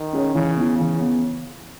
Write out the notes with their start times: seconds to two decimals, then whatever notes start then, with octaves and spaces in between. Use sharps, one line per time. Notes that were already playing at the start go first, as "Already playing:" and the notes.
Already playing: D#3
0.13 C#4 G#4 C#5
0.34 C#3 E3
0.57 B3 E4
0.78 C#3 E3
1.00 B3